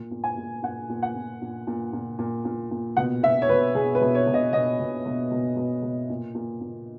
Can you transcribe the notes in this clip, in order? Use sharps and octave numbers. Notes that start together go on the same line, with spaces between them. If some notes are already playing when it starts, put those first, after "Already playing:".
Already playing: A#2
A#2
G#5
A#2
A#2 F#5
A#2
F#5
A#2
A#2
A#2
A#2
A#2
A#2
A#2
B2 F#5
B2 E5
C#5
B2 B4
B2 G#4
B4
B2
C#5
B2
D#5
B2 D#5
B2
B2
B2
B2
B2
A#2
A#2
A#2